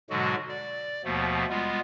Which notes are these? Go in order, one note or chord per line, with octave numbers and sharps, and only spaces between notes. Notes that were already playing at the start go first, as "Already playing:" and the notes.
G#2 B2 D3 F#3 G#3 F#4
D5
D#2 B2 F3 A3 B3
G3 G#3 B3 F4